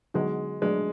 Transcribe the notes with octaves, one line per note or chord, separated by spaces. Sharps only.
D3 F#3 G#3 B3 D#4 F#4
F#3 G#3 A3 D4